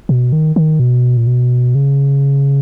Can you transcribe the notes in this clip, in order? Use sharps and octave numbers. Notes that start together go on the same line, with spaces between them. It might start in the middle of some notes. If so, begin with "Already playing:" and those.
B2
D#3
D#3
B2
A#2
B2
C#3